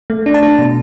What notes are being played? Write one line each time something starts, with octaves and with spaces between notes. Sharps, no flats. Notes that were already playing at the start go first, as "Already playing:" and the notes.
A3
D4
A5
D4
B2